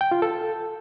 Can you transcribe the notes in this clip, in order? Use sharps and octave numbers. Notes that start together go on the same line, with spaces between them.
G5
F4
A4